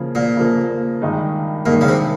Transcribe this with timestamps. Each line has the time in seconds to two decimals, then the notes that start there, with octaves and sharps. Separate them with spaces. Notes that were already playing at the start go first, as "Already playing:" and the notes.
Already playing: C#3 F3 A#3
0.15 A#2
0.37 C#3 F3 A#3
1.02 G2 D#3 G#3 D#4
1.66 G2 A#2 D#3 G#3 D#4
1.81 C#3
1.88 C3